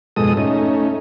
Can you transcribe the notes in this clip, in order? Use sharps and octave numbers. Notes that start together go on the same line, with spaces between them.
F2 G#2 B2 G#3 A4 D#6
A3 C#4 D#4